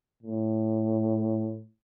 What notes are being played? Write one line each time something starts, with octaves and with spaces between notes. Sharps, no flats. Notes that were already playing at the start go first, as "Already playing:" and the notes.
A2